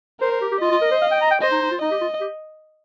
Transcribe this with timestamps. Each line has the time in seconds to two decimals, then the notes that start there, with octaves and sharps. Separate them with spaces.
0.21 A#4 C5
0.31 C5
0.41 G4
0.51 G4
0.61 F4 D#5
0.71 F4
0.81 A#4
0.91 C5
1.01 F5
1.11 G5
1.21 A#5
1.31 G5
1.41 C5 D#5
1.51 D#4
1.61 D#4
1.71 F4
1.81 D#4 D#5
1.91 G4
2.01 F4
2.20 G4